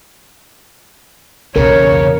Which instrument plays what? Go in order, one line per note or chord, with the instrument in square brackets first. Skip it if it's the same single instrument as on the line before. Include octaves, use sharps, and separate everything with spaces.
[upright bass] B1 E2 [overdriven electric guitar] C#3 [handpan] A#4 [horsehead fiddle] C#5